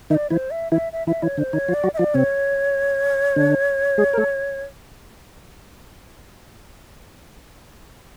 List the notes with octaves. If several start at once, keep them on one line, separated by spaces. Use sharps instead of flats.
D#3 D#4 E5
D5
E3 E4 C5
E5
E3 E4 E5
E5
E3 E4 E5
E3 E4 C#5
D3 D4 C5
D#3 D#4 C#5
F3 F4
D5
F#3 F#4
E5
F3 F4 D5
C3 C4 C#5
D3 D4
G#3 G#4
A#4
A3 A4